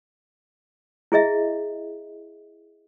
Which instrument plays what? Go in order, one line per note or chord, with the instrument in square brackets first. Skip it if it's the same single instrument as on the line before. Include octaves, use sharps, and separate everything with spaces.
[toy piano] E4 G#4 D#5 E5